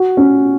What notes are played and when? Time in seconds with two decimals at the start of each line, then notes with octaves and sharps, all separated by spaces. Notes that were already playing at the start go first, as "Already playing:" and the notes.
Already playing: F#4
0.17 C#4